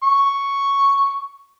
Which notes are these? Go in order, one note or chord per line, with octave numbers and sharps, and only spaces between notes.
C#6